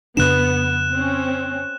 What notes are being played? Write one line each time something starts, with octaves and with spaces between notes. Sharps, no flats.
F2 C#3 B3 D4 F#6 E7
C4 C#4